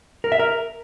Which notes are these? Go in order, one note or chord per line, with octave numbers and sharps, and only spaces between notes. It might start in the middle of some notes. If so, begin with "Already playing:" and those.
A#4
E5
A#4